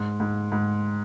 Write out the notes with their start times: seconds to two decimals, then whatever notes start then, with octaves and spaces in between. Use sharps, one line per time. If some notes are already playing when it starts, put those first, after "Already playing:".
Already playing: G#2
0.20 G#2
0.52 G#2